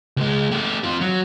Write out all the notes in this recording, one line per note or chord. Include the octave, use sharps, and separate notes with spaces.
C#2 G#3
A3 G4
C4 F4
F#3